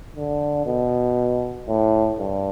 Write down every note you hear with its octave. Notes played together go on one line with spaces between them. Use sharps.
D3
B2
A2
G2